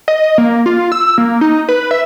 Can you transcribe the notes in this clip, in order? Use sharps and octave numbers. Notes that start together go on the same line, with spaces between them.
D#5
A#3
F4
E6
A#3
D#4
B4
E5